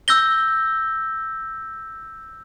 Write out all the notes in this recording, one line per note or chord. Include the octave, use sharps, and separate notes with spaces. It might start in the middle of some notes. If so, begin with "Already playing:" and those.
E6 G6 A#6 G7